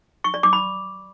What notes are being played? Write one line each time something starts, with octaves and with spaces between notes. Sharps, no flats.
C#6
D5
D6
B5